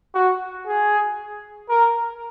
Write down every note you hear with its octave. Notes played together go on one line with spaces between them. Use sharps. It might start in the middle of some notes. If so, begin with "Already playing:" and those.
F#4
G#4
A#4